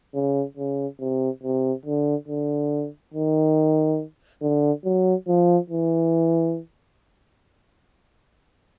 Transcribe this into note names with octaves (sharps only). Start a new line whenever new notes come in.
C#3
C#3
C3
C3
D3
D3
D#3
D3
F#3
F3
E3